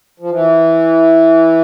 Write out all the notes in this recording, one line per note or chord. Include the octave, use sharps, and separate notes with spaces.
F3
E3